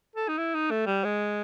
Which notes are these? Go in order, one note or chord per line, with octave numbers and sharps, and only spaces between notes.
A4
D#4
E4
D#4
A3
G3
G#3